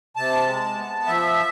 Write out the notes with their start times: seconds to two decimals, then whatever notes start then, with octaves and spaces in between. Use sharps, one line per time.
0.16 C3 A5
0.47 G#3
0.78 B3
1.07 F3 E5